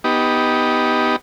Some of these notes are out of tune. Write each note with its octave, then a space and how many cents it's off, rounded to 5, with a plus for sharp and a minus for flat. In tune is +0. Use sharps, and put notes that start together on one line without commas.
B3 +0 D#4 +10 G4 +0